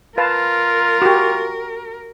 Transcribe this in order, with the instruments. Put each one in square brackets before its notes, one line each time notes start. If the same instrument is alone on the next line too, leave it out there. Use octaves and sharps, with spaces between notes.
[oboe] F4 [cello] A#4 [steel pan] B4 F5 A5
[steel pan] F#4 G4